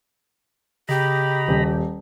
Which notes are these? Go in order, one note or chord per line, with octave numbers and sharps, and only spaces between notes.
C#3 G4 D#5 A#5 B5
D#1